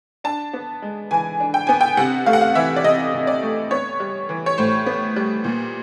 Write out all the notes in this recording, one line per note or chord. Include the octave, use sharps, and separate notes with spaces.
D4 A5
B3
G#3
E3 G#5
D4
G5
B3 G#5
G5
C3 F#5
A3 F5
F#5
F5
E3 E5
D5
C3 D#5
C3
D5
A3
B3 C#5
G3
E3
C#5
A2 C5
B3
G3
A#2